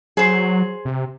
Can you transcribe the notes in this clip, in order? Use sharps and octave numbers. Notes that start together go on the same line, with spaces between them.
F#3 G#4 C5
C3